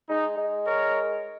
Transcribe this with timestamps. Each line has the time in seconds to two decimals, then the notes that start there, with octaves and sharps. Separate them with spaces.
0.09 G#3 D#4
0.37 G#3
0.64 A#4 C#5